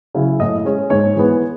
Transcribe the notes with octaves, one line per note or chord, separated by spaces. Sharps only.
C#3 F#3 C#4 E4
A2 D#5
G#3 C#4
G#2 C#5
E3 G#3 B3